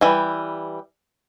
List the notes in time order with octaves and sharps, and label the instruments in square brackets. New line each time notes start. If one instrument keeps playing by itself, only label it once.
[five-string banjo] E3 G3